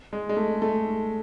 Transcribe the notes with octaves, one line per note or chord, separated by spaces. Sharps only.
G#3
G#3
A3
A3